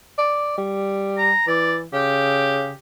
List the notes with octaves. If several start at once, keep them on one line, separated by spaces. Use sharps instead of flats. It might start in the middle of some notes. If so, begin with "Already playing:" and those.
D5
G3
A#5
E3 D5
C#3 G4